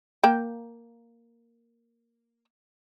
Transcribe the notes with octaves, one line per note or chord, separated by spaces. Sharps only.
A#3 G5